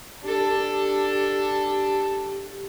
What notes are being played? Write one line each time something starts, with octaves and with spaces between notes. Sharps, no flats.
D4 G4 A4